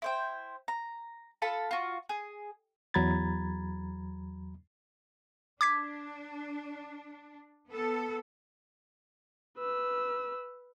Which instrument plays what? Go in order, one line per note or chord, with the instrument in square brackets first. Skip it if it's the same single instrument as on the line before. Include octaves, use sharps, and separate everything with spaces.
[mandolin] E4 C5 G5
A#5
F4 A4 A5 B5
F4 F#4
G#4
[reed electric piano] E2 F#3 A#5 B5 G#6 A6
[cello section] D4 [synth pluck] D6 G#6 B6
[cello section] B3 A4
[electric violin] B4 E6